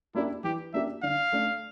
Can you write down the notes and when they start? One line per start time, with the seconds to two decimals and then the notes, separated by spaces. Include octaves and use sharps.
0.15 A#3 D4 E4 G4
0.44 E3 G4
0.73 A#3 D4 G4 E5
1.03 D3 F5
1.32 A3 D4